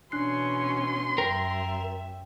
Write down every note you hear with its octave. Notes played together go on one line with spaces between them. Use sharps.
B2 E3 C#4 D4 C6 F#6 C7
F#2 A#4 E5 G5